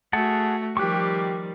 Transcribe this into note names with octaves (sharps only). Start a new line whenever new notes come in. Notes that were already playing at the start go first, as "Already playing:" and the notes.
A3 F#4 G#4 F#5 A5
D#3 F3 G3 G4 C#6 D6 F#6